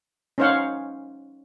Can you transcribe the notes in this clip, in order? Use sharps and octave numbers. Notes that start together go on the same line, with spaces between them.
C#4 D#4 C5 C#5 F5 F#5